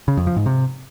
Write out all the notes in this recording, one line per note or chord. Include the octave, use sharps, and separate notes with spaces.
C#3
F2
F3
G#2
C3